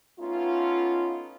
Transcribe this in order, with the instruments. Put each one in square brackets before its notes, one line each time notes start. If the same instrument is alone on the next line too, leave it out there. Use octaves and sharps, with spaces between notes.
[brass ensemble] A3 B3 C#4 D#4 F4